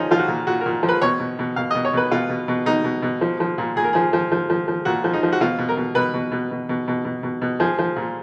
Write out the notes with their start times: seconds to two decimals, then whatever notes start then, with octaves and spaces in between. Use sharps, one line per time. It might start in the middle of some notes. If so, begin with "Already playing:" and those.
Already playing: A#2 F3 C#4 D#4
0.11 F3 F4
0.19 F#4
0.28 A#2
0.47 A#2 F#4
0.61 A#2 A#4
0.83 F3
0.88 B4
1.02 B2 C#5
1.19 B2
1.39 B2
1.56 B2 F5
1.71 B2 D#5
1.85 C#5
1.93 B2 B4
2.11 B2 F4
2.29 B2
2.48 B2
2.66 B2 D#4
2.84 B2
3.02 B2
3.21 F3
3.40 F3
3.58 A#2
3.76 A#2 G#4
3.84 A#4
3.93 F3 G#4
4.13 F3
4.32 F3
4.50 F3
4.68 F3
4.85 A#2 F#4
5.04 F3
5.13 D#4
5.23 F3
5.32 F#4
5.41 B2 F4
5.58 B2
5.69 A#4
5.77 B2
5.95 B2 B4
6.14 B2
6.32 B2
6.51 B2
6.69 B2
6.88 B2
7.05 B2
7.23 B2
7.42 B2
7.60 F3 G#4
7.78 F3
7.96 A#2